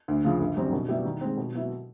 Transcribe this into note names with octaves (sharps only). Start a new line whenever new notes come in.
D2
C#3 F3
G1
F#2 D#3 G3 C4
B2
G3 B3 E4 G4
D#3
G#3 C4
B2
F#3 B3 E4